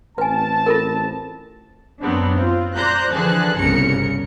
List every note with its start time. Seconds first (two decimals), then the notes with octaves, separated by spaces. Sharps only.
0.18 A1 C4 B4 G#5 A5
0.66 F4 A4 A#4
2.00 F#2 F#3 B3 C4 D4
2.33 C4 F4
2.74 C5 D5 A#5 F#6 G6 A#6
3.13 D3 E3 F3 G#4 A5 F#6
3.58 G1 C2 C#3 A#4 C#7